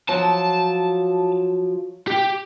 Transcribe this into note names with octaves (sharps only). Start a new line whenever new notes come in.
F3 F#3 A5
G4